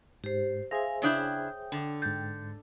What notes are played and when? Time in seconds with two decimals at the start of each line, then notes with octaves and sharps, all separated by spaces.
0.24 G#2 G4 C5
0.71 G#4 C5 E5 F5 G#5 A#6
1.02 C#3 D4 E4 C#5 G5 D#6 G6
1.72 D3
2.02 G#2 G6 A6